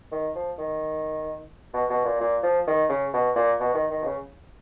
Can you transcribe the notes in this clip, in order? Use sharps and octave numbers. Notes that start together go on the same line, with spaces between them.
D#3
F3
D#3
B2
B2
A#2
A#2
F3
D#3
C#3
B2
A#2
B2
D#3
D#3
B2
C#3